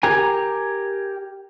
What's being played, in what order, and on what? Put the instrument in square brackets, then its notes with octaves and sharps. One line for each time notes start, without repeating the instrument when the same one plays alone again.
[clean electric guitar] G4 A#4 G#5